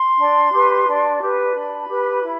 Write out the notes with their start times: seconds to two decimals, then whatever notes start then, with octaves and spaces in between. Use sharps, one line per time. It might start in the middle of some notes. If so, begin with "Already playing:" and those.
Already playing: C6
0.18 D4
0.52 G4 B4
0.86 D4
1.21 G4 B4
1.54 D4 B5
1.88 G4 B4
2.22 E4